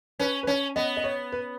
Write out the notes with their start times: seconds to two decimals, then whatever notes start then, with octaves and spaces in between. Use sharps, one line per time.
0.19 C#4 B4
0.43 B4
0.47 C#4 C#5
0.76 B3 D#5
0.97 D#5
1.04 C#5
1.32 B4